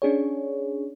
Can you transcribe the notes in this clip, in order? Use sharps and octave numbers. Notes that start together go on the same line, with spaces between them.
C#4 D4 G#4 C#5